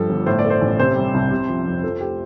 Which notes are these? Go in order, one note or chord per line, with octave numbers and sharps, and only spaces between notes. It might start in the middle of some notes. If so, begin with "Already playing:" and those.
Already playing: G2 F3 A4
G1
A2 C5
D5
A3
C5
A1
C3 C5
G3
C2
C3
F3
F2
F3 A4
A3 G4